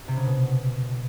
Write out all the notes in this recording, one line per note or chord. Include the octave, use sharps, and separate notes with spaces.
C3
C#3
B2